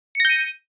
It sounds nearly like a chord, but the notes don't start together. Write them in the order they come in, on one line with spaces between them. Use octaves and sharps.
C#7 A#6 G6 D#7